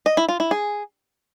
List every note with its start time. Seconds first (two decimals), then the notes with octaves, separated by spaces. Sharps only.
0.06 D#5
0.17 E4
0.29 F4
0.40 E4
0.51 G#4